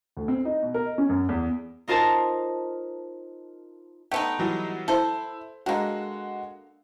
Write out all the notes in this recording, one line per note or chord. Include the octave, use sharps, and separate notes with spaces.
D2
C4
D#4
B2
A#4
D#5
C#4
F#2
E2
D#4 F4 A#4 C5 A5 A#5
A3 B3 D#4 G5
E3 F#3 G3
E4 A4 C5
D3 G#3 A#3 F#4